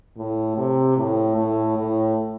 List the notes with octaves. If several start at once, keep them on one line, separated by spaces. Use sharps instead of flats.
A2
C3
A2
A2
A2